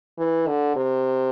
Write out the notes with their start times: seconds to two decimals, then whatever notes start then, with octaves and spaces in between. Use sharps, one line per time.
0.18 E3
0.47 D3
0.76 C3